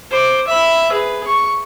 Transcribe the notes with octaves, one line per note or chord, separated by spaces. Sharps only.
C5 D6
E5 B5
G#4 B4
C#6